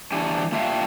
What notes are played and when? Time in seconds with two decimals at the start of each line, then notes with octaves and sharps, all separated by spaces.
0.12 E3 D4 G4 G#5
0.52 A#3 D4 F4 G4 E5 F5